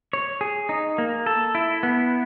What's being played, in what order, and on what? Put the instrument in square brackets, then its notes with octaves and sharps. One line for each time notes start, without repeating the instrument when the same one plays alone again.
[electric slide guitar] C#5
G#4
D#4
A#3
A4
E4
B3